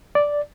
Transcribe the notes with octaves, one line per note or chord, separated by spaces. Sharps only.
D5